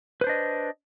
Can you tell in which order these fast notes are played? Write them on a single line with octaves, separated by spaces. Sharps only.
B4 C5 D4 D#5